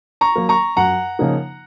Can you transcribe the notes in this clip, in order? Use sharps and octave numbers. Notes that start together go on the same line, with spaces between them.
A#5 C#6
F#3 A#3
A#5 C#6
F#2 F#5 A#5
C#3 F3 A#3 D#4